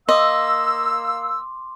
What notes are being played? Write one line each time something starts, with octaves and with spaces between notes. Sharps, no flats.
A#3 D#5 F5 C6 D6 E6